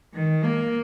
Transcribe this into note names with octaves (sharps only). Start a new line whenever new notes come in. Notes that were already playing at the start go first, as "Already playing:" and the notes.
D#3
A#3